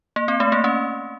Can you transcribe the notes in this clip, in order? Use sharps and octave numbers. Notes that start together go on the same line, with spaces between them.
A#3
C4
A3
A#3
C#4